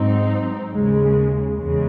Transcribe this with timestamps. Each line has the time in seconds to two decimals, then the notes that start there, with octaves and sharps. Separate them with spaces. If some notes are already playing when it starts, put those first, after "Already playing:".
Already playing: G#2 F#3 C4 D#4
0.71 D#2 C#3 G#3
1.58 E2 C#3 G#3